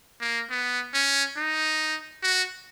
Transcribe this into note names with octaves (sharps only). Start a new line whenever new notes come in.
A#3
B3
C#4
D#4
F#4